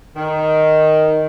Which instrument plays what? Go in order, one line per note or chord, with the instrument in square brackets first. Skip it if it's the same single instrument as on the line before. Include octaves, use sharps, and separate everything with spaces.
[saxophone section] D#3